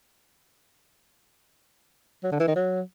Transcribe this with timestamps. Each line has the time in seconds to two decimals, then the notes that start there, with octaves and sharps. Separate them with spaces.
2.24 F#3
2.32 D3
2.40 E3
2.48 D#3
2.56 F#3